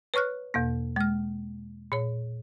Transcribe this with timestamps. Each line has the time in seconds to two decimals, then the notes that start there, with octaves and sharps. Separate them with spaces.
0.14 B4 C#5 C#6 F6 F#6
0.54 E2 B2 A#3
0.96 G#3 F6
1.92 A#2 C#5